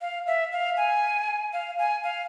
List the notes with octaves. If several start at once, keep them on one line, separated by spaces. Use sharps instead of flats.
F5
E5
F5
G#5
F5
G#5
F5